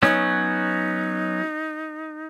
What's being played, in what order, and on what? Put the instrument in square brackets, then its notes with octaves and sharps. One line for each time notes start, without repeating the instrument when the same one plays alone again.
[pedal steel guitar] F#3 B3 C#4 [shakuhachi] D#4